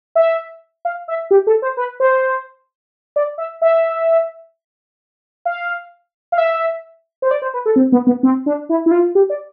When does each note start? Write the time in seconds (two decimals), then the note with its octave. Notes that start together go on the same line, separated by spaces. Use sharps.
0.15 E5
0.85 F5
1.08 E5
1.31 G4
1.47 A4
1.62 C5
1.77 B4
2.00 C5
3.16 D5
3.38 E5
3.62 E5
5.45 F5
6.32 F5
6.38 E5
7.22 C5
7.31 D5
7.42 C5
7.54 B4
7.66 A4
7.76 C4
7.92 B3
8.07 B3
8.23 C4
8.46 D4
8.69 E4
8.86 E4
8.91 F4
9.15 G4
9.30 D5